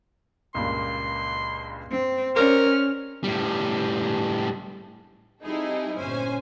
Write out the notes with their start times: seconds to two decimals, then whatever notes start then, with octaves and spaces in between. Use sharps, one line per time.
0.55 C#2 G2 A#2 C6
1.92 C4
2.36 C#4 A#4 C5 D5 F6
3.24 A2 G3
5.43 G3 C4 D#4 E4 G#4 A4
5.97 G1 A#2 C#4 C5 G#5